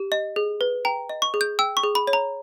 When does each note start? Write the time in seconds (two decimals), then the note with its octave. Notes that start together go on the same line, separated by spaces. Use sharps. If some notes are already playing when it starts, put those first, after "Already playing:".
Already playing: G4
0.12 D#5
0.36 G#4
0.61 B4
0.85 G5 A#5
1.09 D#5
1.22 C#6
1.34 G#4
1.41 G6
1.59 G5 E6
1.77 C#6
1.83 G#4
1.95 B5
2.07 C#5
2.13 A#5